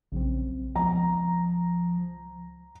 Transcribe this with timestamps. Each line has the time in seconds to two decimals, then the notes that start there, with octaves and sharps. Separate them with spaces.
0.12 A#1 C#3 F#3 C4
0.76 C#2 F3 A#5